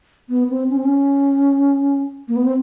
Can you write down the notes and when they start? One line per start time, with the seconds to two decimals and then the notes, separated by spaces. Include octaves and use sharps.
0.29 B3
0.50 C4
0.70 C#4
0.77 C4
0.85 C#4
2.28 A#3
2.36 B3
2.45 C4